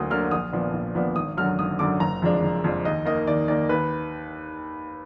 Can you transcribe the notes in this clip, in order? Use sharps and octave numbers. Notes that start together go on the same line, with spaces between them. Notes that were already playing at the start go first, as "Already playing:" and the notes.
Already playing: D2 D3 F#3 A#3 D#6
D3 F#3 A#3 F6
A#1 D#6
A#2 F3 B3 D4
A#1
A#2 F3 B3 D4
G#1 D#6
F#2 D3 F#3 F6
G#1 D#6
F#2 D3 F#3 D6
F#1 A#5
F2 F3 G#3 D4
F#1
F2 F3 G#3 D4
D#2 D#5
D#3 A#3 D#5
D#2 D5
D#3 A#3 D5
D#2 B4